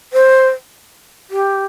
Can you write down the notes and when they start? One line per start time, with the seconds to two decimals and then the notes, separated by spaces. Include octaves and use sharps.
0.13 C5
1.30 G4